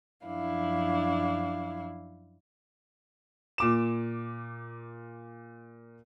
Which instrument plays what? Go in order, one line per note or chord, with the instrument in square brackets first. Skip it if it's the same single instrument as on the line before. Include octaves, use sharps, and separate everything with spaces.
[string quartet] F#2 F3 D4 E4 F5
[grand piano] A#2 D6 E7